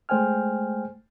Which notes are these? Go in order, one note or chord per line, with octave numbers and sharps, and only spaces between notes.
G#3 A3 C5 G5 G#5 F6